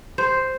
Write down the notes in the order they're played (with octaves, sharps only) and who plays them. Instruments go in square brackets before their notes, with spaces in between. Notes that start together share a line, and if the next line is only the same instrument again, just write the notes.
[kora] C5